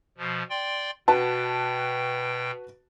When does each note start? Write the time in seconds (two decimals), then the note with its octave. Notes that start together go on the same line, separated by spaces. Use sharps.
0.18 B2 F3
0.50 D5 G5 C6
1.08 B2 F#4 B4 G5 A5